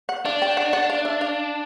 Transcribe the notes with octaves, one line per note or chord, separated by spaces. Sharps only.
F#5
D4 F5
G5
F#5
F#5
F5
E5
F5